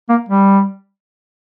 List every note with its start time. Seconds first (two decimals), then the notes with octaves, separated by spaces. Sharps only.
0.09 A#3
0.29 G3